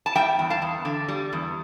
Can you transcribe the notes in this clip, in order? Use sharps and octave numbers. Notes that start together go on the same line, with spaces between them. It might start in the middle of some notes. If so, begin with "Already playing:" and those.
A5
G3 E5 G5
E2
F5 A5
E2
D3
G3
E2